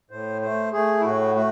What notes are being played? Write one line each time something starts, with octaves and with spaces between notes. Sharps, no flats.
A2 C5
A3 C5
A3 G#4
E4
A2 F#4
A3 F#4